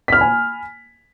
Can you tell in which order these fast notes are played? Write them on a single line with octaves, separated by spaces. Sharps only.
B6 F6 B5 G#5